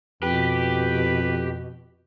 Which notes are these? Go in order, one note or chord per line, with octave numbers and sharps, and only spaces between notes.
F2 B2 G4 B4